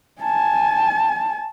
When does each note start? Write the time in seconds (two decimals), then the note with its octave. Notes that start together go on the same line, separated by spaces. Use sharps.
0.22 G#5 A5